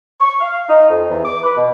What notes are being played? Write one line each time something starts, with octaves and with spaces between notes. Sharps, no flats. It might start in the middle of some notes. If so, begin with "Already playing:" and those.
C#6
F5
D#4
F2
E2
D6
B4
B2